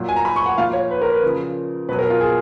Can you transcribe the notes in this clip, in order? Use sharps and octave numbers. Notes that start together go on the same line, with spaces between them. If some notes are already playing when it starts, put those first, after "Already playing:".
Already playing: A#2 F#3
G#5
A#5
B5
C#6
F#5
A#2 F3 F5
C#5
B4
A#4
B4
C#3 F3
B2 F#3 B4
A#4
F4
G#4